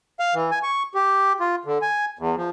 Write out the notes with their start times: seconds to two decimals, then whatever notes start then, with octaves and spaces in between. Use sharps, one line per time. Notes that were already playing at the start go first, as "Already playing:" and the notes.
0.20 F5
0.35 E3
0.51 G#5
0.63 C#6
0.95 G4
1.40 F4
1.65 D3
1.82 G#5
2.19 E2
2.36 F3